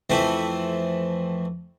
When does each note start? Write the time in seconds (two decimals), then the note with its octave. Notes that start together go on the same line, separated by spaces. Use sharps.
0.10 F2 E3 A3 C4 A4 B5